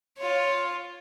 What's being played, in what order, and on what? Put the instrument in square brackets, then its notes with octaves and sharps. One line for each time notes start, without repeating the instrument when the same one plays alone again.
[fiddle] F4 C#5